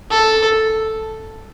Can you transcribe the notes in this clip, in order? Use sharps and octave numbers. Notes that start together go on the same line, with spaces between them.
A4